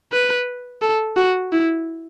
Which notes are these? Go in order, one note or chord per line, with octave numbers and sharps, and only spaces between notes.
B4
A4
F#4
E4